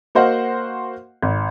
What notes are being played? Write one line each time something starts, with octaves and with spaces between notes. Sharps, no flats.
A#3 F#4 C5 D#5 F5 F#5
G#1